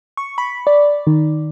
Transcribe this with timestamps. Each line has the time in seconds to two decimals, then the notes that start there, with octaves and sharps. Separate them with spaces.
0.17 C#6
0.38 B5
0.67 D5
1.07 D#3